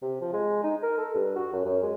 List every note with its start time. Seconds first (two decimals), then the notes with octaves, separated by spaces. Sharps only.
0.02 C3
0.21 F3
0.33 G#3
0.63 D#4
0.82 A#4
0.98 A4
1.15 G2
1.35 F#4
1.53 F#2
1.65 F#2
1.83 G#3